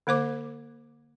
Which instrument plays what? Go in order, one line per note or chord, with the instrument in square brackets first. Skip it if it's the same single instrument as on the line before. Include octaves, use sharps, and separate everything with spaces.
[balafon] D3 A#3 C5 D6